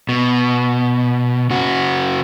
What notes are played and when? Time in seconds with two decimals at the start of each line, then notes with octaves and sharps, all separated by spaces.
0.09 B2
1.50 C#3 F#4